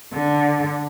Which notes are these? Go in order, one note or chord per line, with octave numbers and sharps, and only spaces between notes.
D3